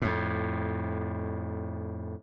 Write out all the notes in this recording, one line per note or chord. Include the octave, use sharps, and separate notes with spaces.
F2 A2